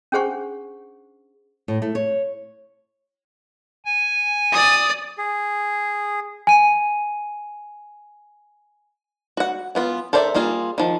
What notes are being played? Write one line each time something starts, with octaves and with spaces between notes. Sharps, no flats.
C#4 D4 G#4 C5 F#5 C#6
A2
A3
C#5
G#5
D5 D#6
G#4
G#5 D#7
F#4 F#5
E3 B3 F4
A4 A#4 C5 D5 E5
G3 A#3 F4 G#4
D#3 F3